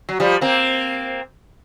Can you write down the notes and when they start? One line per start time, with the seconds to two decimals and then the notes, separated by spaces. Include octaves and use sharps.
0.09 F#3
0.20 F3 G3
0.41 A#3 C4